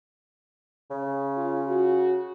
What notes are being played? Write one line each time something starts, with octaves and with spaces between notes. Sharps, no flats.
C#3
F4
F#4